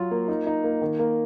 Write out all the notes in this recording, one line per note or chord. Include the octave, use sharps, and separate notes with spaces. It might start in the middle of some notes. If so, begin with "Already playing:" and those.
Already playing: F#3 F4
A#3
D#4
D#4
A#3
D#3
A#3